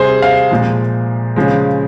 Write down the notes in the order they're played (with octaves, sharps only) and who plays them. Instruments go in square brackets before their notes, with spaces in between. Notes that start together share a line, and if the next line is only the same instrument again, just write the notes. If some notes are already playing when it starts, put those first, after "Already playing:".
Already playing: [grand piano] C3 G3 G#4 C5
F5
A#2 F3 G#3
C#3 F3 G#3